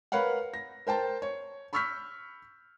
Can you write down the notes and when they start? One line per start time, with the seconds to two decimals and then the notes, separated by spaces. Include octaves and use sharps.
0.12 A#4 B4 C#5 F5 F#5
0.54 A#6
0.87 A#4 C5 G5 A5
1.22 C#5
1.73 B5 C#6 E6 F6 G6 B6